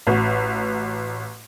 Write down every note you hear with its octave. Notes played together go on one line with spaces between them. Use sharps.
A1 F#4